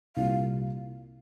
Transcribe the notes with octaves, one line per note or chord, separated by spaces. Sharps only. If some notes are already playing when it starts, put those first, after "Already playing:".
C2 A#2 G3 F5